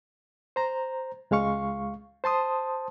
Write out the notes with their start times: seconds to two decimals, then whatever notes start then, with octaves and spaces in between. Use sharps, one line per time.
0.56 C5 A#5
1.31 C#2 G#3 F5 C#6
2.24 C5 A5 C6 D#6